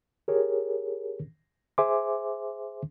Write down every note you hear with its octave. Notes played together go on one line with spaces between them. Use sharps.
G4 G#4 A#4 C#5
G#4 C5 E5 G#5 C6 D6